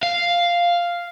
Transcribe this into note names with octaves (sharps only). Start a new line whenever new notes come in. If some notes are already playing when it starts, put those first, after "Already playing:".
F5